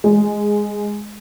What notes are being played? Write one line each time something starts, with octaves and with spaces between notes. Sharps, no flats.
G#3